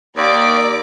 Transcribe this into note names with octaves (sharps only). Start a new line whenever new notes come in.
D#2 A#3 D5 D6